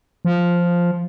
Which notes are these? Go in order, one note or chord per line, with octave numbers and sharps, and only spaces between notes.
F3